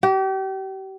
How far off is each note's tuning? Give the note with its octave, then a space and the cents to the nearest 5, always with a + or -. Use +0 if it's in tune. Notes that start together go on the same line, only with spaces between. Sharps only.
G4 -35